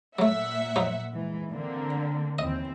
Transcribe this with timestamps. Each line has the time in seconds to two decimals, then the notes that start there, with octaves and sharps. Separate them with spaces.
0.19 A#2 F#3 A3 E5 F#5
0.76 F3 F#3 D#4
1.13 G#2 E3
1.51 D3 A#3 C4
2.39 D#2 E3 C4 D#5